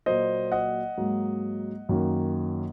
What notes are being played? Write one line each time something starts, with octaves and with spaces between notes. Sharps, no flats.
A#2 F#3 A#3 C5 D#5
D#5 F#5
G#2 F#3 A#3
F#2 D#3 F#3 A#3